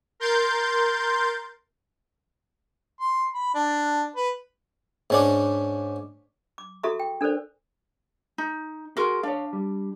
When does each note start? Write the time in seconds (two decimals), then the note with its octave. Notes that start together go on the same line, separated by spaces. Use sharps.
0.20 A#4 C6 G6 A6
3.00 C6
3.34 B5
3.54 D4
4.16 B4
5.10 G#2 C#4 D4
6.58 D6
6.83 F#4 G#4 A4 E5 A#5 C#6
7.00 G5
7.21 D4 A4 A#4 C5 D5
8.38 D#4
8.97 F#4 G#4 A#4 C6
9.23 D4 C#5 F5
9.53 G3